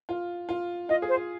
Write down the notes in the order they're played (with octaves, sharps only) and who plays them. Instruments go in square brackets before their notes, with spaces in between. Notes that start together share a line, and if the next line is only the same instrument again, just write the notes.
[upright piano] F4
F4
[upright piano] F4 [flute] D#5
[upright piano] G#4
[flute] C5
[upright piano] F4